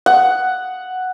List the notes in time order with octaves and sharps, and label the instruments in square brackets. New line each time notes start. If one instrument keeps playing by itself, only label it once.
[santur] F#5